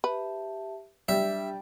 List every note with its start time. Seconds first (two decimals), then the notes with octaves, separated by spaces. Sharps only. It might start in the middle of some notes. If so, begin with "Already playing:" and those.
0.04 G4 B4 E5 A5
1.08 G3 D4 G4 E5